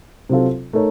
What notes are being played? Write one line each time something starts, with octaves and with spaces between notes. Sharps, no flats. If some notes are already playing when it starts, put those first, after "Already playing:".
C3 F#3 C4 F4 A4
A3 D#4 A#4 C#5